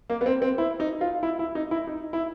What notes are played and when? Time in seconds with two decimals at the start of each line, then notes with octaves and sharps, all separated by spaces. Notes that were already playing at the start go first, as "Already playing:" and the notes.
0.10 A#3
0.21 B3
0.26 C4
0.42 C4
0.58 E4
0.80 D#4
1.01 F4
1.23 E4
1.39 E4
1.55 D#4
1.71 E4
1.87 D#4
2.13 E4